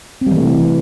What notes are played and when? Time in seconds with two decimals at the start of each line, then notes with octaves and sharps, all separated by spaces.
0.21 C4
0.26 G3
0.31 E3
0.36 A3
0.41 C3